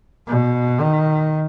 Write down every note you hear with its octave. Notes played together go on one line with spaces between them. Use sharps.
B2
D#3